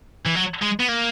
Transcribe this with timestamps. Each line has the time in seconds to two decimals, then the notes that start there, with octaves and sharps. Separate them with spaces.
0.26 E3
0.35 F#3
0.62 G#3
0.80 B3
0.88 A#3